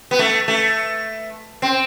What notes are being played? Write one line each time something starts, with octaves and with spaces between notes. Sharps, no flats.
B3
A3
A3
C4